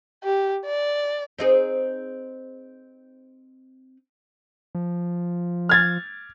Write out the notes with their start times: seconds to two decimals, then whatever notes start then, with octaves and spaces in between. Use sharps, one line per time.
0.23 G4
0.65 D5
1.39 C4 D#4 G#4
4.75 F3
5.69 F6 G#6 A6